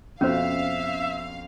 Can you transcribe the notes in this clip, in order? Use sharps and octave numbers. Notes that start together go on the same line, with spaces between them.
F2 B2 C#4 C5 E5 F5